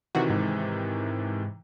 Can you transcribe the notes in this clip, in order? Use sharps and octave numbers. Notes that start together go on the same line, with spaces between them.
C3 D#3 E3 F#4
G#2